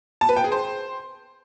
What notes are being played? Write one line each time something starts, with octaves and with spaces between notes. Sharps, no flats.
A5
B4
G5
G#4
C5